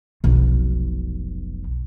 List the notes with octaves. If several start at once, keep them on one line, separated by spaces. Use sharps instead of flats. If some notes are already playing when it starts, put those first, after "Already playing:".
F1 B1